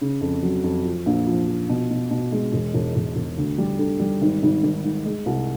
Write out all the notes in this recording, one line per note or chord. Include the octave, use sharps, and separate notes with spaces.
C#3
F2
F#3
F2
F3
A#1
F3
F3
B2
B2
B2
G#3
E1
E1
E1
E1
D2
G3
D3
G3
G#1
G#1
G#1
G#2
G#3
C2